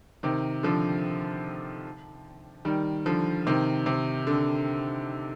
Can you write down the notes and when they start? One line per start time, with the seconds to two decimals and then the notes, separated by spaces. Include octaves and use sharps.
0.23 C3 D#3
0.63 D3 F3
2.65 D#3 G3
3.06 D3 F3
3.47 C3 D#3
3.86 C3
4.27 D3